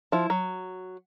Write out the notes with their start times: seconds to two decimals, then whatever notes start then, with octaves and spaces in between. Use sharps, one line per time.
0.12 F3 E4
0.30 F#3